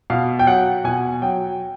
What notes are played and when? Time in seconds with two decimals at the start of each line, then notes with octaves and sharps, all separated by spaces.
0.10 B2 F5
0.39 G5
0.47 F#3 F#5
0.84 B2 G#5
1.22 F#3 G5